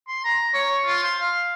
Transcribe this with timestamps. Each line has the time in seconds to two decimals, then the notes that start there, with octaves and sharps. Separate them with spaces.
0.08 C6
0.25 A#5
0.54 C#5
0.86 F4
1.03 C6
1.20 F5